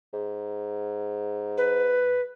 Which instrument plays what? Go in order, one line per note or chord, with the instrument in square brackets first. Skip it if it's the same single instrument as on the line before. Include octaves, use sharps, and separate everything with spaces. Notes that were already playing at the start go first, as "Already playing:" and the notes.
[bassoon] G#2
[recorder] B4